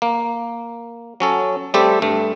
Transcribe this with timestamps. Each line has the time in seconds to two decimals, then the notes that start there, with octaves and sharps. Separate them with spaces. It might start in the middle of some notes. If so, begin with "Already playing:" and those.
0.02 A#3
1.20 F#3 C#4 A4
1.74 G3 A3 C4 G4 A4
2.02 G2 A3